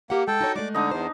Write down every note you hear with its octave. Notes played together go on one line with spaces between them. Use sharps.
A#3 G4 F#5
G#3 A4 G5
D#4 F#4 C#5
G#3 A3 D5 D6
D3 D4 D#4 D#5
E2 C5